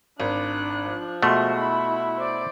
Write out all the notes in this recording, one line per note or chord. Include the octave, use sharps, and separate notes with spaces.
G#1 D4 F#6
F3
B2 G#3 A3 F#4 E5 C6
E4 B5
C5 D5